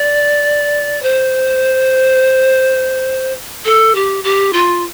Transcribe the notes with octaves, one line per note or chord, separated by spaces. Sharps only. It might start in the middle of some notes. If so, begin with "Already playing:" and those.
Already playing: D5
C5
A4
G4
G4
F4